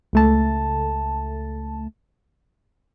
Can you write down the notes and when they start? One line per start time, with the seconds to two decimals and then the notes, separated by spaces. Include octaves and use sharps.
0.13 C#2 A3 A5